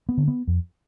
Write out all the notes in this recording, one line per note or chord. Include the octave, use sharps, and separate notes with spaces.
B3
D3
B3
F2